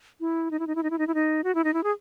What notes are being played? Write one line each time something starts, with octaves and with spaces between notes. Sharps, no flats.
E4
D#4
E4
D#4
E4
D#4
E4
D#4
E4
D#4
F#4
E4
D#4
E4
G#4